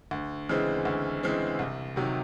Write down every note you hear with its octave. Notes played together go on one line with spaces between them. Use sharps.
D2
C#3 E3 G#3 C4
D2
C#3 E3 G#3 C4
C2
C3 D#3 F#3